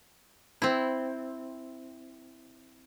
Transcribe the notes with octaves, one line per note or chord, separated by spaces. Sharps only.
C4 E4